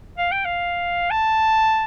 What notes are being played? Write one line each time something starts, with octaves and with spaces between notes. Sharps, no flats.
F5
G5
F5
A5